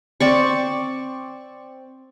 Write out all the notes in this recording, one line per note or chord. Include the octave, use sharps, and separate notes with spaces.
C4 D5 C#6